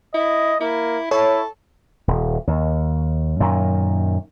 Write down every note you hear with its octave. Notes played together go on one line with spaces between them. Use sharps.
E4 D#5
A#3 E4
E4 A4 C#5
D#1
D#2
F#2 A#2 D#3